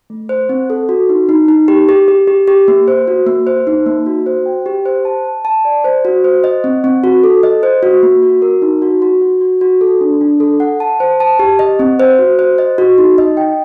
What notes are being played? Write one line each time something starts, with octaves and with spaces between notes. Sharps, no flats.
A3
C5
C4
A4
F#4
D#4
D#4
D#4
G4
G4
G4
G4
G4
A#3
C5
F#4
A#3
C5
D#4
A#3
F#4
C5
G5
G4
C5
A5
A5
A5
D5
C5
F#4
C5
D#5
C4
C4
F#4
A4
D#5
C5
F#4
A#3
F#4
A#4
D#4
F#4
F#4
F#4
F#4
F#4
A4
D4
D4
A4
F#5
A5
C5
A5
G4
D#5
C4
C5
F#4
C5
D#5
F#4
D#4
D#5
G5